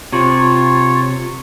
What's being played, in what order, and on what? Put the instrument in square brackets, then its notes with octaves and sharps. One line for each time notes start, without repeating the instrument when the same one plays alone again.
[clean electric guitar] C3 [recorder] F4 [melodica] C#5